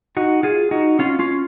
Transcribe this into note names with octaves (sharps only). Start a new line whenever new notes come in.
D#4 F#4
F4 G#4
D#4 F#4
C#4 F4
C#4 F4